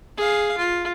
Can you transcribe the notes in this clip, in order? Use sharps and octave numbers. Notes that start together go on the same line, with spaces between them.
G#4 F5
F4